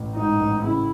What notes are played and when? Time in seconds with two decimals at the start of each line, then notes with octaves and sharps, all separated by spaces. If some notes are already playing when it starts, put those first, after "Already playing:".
Already playing: A1
0.16 G#2 D#4
0.40 A1
0.63 C#3 E4